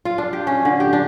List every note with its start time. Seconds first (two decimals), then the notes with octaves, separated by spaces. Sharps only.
0.05 F4
0.18 D4
0.33 G4
0.47 C#4
0.65 D3
0.80 G4
0.93 D4